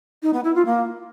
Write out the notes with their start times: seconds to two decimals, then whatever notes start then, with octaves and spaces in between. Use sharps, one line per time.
0.23 D#4
0.33 B3
0.44 E4
0.55 F4
0.66 A#3